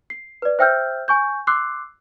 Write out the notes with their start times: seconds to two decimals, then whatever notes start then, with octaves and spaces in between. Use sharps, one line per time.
0.10 C7
0.42 B4 D5
0.59 C5 E5 G5 E6 F6 G6
1.08 G#5 C#6 G6
1.47 C6 D6 E6 F#6 C7